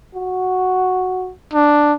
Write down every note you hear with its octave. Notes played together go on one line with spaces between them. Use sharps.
F#4
D4